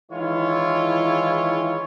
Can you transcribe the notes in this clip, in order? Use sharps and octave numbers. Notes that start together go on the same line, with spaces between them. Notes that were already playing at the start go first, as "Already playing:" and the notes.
D#3 E3 G#3 E4 F4 C#5